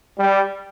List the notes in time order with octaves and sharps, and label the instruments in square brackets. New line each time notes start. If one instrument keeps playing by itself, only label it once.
[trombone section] G3